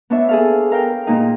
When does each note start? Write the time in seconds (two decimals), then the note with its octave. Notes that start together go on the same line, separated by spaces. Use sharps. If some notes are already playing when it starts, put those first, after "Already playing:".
0.10 B3 D4 C#5 E5
0.29 G#4 A4 F5
0.71 A#4 F5 G5
1.07 A#2 A#3 D#4